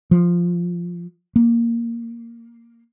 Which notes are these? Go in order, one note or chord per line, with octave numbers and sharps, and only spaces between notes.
F3
A#3